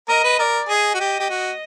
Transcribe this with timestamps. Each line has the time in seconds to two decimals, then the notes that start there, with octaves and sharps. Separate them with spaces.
0.09 A#4 D#5
0.24 B4
0.39 A#4 D5
0.69 G#4 D#5
0.94 F#4
1.00 G4
1.20 G4
1.30 F#4